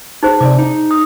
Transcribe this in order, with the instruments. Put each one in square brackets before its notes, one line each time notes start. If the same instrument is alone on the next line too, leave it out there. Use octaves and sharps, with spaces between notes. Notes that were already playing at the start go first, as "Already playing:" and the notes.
[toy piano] D#4 G#4 C5
[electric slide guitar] C3 A#4 D5 [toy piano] D6
[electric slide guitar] D#4
[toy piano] D#6